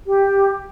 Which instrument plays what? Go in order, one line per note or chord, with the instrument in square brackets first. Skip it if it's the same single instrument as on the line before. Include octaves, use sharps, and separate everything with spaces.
[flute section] G4